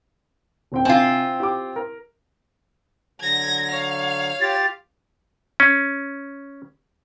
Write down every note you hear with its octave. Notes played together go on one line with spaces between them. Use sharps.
D#1 C4 G5
C3 C4 F4 G#5
G4 G5 D6
A#4
D3 F#3 G#6 A#6
C#5 F5
F4 G4 A6
C#4